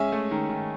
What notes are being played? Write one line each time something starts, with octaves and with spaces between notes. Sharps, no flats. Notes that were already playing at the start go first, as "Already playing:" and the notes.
Already playing: G#3 C#4 E5 G#5
A3
D#3
D#3